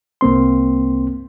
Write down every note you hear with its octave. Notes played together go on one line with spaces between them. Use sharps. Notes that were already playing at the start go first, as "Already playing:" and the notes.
C2 A#3 C4 C6